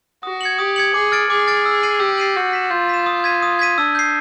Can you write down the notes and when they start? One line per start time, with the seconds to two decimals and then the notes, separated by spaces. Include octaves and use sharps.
0.23 F#4 D#6
0.41 G#6 C#7 F#7
0.59 G4 D#6
0.76 G#6 C#7 F#7
0.94 G#4 D6
1.12 F6 A6 D7
1.30 G#4 D6
1.47 F6 A6 D7
1.66 E6
1.83 A6 C7 D#7 F#7
2.00 G4 E6
2.18 A6 C7 D#7 F#7
2.36 F#4 G6
2.53 B6 E7
2.70 F4 G6
2.89 B6 E7
3.06 D#6
3.24 G#6 B6 D#7
3.42 D#6
3.59 G#6 B6 D#7
3.77 D4 E6
3.95 G6 C7